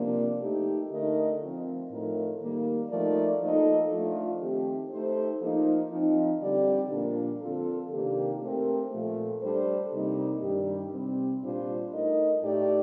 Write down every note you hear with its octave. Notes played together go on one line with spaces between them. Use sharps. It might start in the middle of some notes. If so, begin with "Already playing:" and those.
Already playing: C3 F3 A#3 D4
A3 D#4 G4
D3 A3 D#4 A#4 D#5
F3 C4 F4
A2 F3 A3 D#4 A#4
D#3 G3 A#3
F3 A3 D#4 A#4 D5
F3 A#3 D#4 A4 D#5
F3 A3 D4 F4
D#3 A3 C4 G4
A3 D#4 G4 C5
F3 A#3 D#4
F3 C4 D#4
D3 G3 C4 G4 D5
A#2 F3 A#3 D4
D3 F3 C4 F4 A4
C3 D#3 A#3 D4 G4
A3 C4 G4 A#4
A#2 F3 A3
G3 D4 A4 C5
C3 G3 A#3 D#4
G2 D#3 G3 D4 G4
C3 G3 C4
A#2 G3 D4 F4 C5
A3 D#4 A#4 D#5
A2 A3 D#4 G4 D5